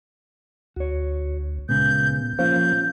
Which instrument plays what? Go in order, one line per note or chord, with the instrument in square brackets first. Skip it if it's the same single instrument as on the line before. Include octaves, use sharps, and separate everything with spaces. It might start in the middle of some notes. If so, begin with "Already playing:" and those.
[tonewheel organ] D2 [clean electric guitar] F#4 C#5
[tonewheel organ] A#2 [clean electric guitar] C#3 G#3 B3 [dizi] G6
[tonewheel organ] F3 A#3 [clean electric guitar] C#4 F4 [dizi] G6